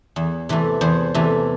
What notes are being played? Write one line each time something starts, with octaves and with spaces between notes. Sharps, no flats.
E2
C3 E3 A3
E2 C5
C3 E3 A3